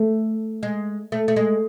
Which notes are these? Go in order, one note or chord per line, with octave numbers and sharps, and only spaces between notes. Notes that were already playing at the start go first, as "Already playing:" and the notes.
Already playing: A3
G#3
A3
A3
G#3